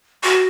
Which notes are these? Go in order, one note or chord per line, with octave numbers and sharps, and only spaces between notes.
F#4